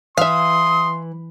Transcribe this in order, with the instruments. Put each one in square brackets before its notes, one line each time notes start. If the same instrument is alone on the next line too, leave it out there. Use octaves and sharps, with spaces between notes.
[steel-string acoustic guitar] E3 [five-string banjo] E5 F5 [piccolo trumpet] C6 [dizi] D#6